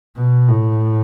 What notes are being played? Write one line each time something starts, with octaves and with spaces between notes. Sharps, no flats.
B2
A2